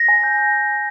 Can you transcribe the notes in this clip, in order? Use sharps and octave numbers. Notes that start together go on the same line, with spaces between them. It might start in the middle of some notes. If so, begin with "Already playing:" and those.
Already playing: A#6
G#5
G6
G6